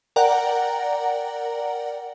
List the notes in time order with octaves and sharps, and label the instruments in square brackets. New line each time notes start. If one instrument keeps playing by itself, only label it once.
[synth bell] A#4 D5 F#5 G5 A#5